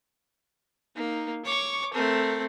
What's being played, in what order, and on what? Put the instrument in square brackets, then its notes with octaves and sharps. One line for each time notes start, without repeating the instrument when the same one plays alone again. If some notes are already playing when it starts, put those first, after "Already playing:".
[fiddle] A#3 [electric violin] D#4
[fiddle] C#5 [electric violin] C#6 D6
[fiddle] A3 C4 [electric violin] A#4